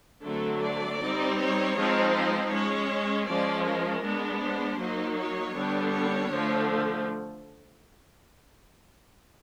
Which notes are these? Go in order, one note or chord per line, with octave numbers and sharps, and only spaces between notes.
D3 F#3 A3 C4 A4
D5
G3 C4 D#4
C#5
F3 G#3 C4 D#4
C5
G#3 C#4 C#5
F3 G#3 C#4 D5
A#4
G#3 B3 D4
C5
F#3 A#3 D#4
C#5
D3 G3 B3 D4
C#5
D3 F3 A3